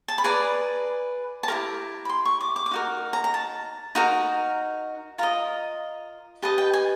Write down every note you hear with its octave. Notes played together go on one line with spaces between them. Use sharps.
A5
B5
G#4 B4 D5 A#5
A5
E4 G4 A#4 A#5
B5
C6
C#6
D6
D6
D6
D#4 F#4 A#4
A#5
A#5
A5
D#4 F#4 A#4 A#5
F4 A#4 D#5 A#5
G4 B4 D#5 A5
G5
G#5